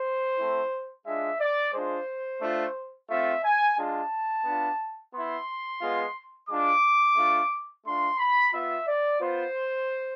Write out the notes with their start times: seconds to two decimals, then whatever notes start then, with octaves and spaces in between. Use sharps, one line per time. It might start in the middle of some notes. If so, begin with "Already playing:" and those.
Already playing: C5
0.38 A3 C4 E4
1.05 G#3 D4 F4 E5
1.40 D5
1.73 G#3 D4 F4 C5
2.41 A3 D4 F4
3.09 A3 C4 F4 E5
3.43 G#5
3.77 G#3 D4 F4 A5
4.45 B3 D4 F4
5.13 B3 E4 C6
5.81 G#3 B3 F4
6.49 G#3 D4 F4 D6
7.17 A3 D4 F4
7.85 A3 D4 F4 C6
8.18 B5
8.53 B3 F4 E5
8.87 D5
9.20 B3 F4 C5